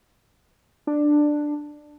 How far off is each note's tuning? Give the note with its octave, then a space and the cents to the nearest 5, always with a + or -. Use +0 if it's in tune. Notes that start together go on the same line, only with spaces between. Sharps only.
D4 +10